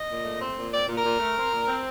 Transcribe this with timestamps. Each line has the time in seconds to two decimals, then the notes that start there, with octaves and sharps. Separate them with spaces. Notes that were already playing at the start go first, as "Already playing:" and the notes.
Already playing: D#5
0.09 A#2
0.24 A3
0.41 C4
0.57 A#2
0.73 C4 D5
0.88 A#2
0.97 A#4
1.05 A#2
1.20 A3
1.36 C4
1.52 A#2
1.68 C4